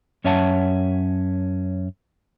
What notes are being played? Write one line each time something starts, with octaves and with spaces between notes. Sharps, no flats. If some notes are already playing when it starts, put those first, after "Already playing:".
F#2 C#4 C#5 E5 F#5 A5